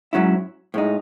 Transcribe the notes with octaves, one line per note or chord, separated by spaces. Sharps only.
G#2 F#3 C#4 E4
A2 G#3 D#4